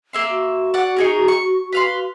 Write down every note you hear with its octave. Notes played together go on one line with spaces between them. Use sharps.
A#3 E5 C6
F#4
D5 F#5
D#4 G#4 A#4
C#6
B4 F5 C6